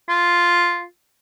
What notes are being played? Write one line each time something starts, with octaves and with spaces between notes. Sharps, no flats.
F4